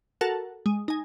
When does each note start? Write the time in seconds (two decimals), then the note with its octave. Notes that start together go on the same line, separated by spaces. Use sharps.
0.21 F#4 A4 A#4 F#5 A5
0.66 G#3
0.88 D#4 G#5